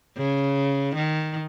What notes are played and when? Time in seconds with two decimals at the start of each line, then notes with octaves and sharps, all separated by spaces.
0.17 C#3
0.95 D#3